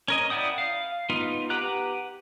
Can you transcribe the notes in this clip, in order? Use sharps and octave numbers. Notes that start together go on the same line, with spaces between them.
C#4 A#4 D#5
E4 D5 F#5 G5 D#6
F5
B3 D#4 F4
G4 B4 F#5 A#5 F#6